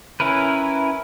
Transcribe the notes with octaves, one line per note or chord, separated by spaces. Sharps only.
C#4 E4 A#4 B4